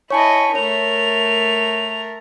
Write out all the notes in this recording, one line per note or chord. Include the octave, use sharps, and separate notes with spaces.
E4 C#5 D#5 G#5 A5 C#6
A3 A#4 C#5 F7